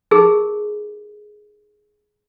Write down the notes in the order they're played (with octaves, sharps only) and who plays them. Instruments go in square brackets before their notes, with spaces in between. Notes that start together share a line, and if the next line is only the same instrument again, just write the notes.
[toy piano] D#4 G4 G#4 A#4